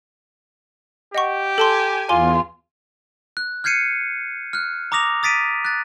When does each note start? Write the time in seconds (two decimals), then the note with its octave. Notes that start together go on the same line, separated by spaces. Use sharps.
1.15 G4 D#5 F#5 C#6
1.58 A4 G#5 A5 C6
2.09 E2 F4 G#5 C6 D6
3.37 F#6
3.64 F6 G6 G#6 C7 C#7 D#7
4.53 F6 F#6
4.92 A#5 D6 D#6 A#6 F7
5.23 D#6 A6 B6 D7 D#7
5.65 F#6 A6